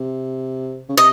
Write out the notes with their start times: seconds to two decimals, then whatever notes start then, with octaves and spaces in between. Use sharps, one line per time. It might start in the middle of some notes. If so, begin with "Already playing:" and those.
Already playing: C3
0.89 C#3
0.97 C3 D#5